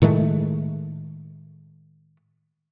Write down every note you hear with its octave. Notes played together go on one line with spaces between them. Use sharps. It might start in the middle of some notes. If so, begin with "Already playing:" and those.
A2 D#3 G#3 A3